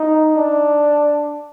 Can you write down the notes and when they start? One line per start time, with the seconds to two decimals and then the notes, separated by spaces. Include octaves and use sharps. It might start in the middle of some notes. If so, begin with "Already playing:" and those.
Already playing: D#4
0.36 D4